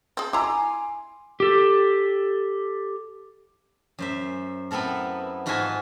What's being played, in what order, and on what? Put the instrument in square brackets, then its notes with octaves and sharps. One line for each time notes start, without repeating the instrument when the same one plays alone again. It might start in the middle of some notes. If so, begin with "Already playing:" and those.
[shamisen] C4 G#4
[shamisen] E4 A#5 [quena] G#5 [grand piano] C6 D6
[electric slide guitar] G4 A4
[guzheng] F#2 C5 E5
B3 C4 E4 A4 A#4
G#2 F4 F#4 A4 E5 G#5